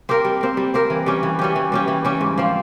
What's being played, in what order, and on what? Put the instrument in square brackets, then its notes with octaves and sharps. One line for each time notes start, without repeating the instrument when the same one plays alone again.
[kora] C4 G4 A#4
G3
C4 G4 A#4
G3
C4 G4 A#4
E3
G3 C#4 G4
E3
G3 C#4 G4
E3
G3 C#4 G4
E3
G3 C#4 G4
G#2
F3 C4